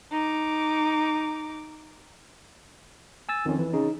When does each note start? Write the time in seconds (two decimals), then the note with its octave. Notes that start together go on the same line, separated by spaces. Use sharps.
0.11 D#4 D6
3.29 G#5 E6 A6
3.46 F2 D#3 C#4
3.59 E3
3.73 C#3 D#4